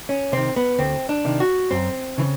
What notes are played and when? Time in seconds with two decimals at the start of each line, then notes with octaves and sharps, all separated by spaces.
0.09 C#4
0.32 C3 D#3 C4
0.56 B3
0.79 D2 C4
1.09 D4
1.25 C3 D#3
1.40 F#4
1.71 F#2 C4
2.18 C#3 E3